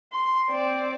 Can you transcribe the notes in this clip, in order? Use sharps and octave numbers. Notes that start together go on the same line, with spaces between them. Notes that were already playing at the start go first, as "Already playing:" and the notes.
C6
C4 D5